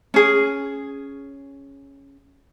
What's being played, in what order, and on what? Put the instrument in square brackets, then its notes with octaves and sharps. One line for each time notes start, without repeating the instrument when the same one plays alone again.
[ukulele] C#4 G#4